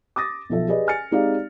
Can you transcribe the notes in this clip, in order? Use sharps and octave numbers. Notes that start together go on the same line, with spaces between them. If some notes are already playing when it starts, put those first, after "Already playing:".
D6 D#6 A6 A#6
B1 F3 A4 E5
G4 G#4 B4 D5 D#5
G#5 F6 A6 C#7
G#3 C4 D#4 G4 D5 F5